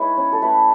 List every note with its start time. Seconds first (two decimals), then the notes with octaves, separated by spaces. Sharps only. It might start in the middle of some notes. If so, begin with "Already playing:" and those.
Already playing: G#3 D#4 E4 B4 C#5
0.17 C#4
0.32 A4
0.42 A3 B4